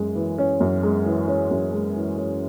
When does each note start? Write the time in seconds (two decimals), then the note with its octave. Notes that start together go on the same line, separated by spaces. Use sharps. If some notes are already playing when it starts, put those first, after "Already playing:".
Already playing: F#2 G#3 C#4
0.15 E3
0.38 C#4
0.60 F#2
0.83 G#3
1.06 E3
1.28 C#4
1.51 F#2
1.73 G#3
1.96 E3
2.18 C#4